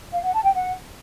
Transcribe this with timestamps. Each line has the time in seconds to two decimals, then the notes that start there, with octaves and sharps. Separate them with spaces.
0.13 F5
0.23 F#5
0.33 A5
0.44 G5
0.54 F#5